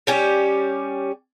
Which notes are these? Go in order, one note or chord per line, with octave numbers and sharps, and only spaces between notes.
G3 C#4 G4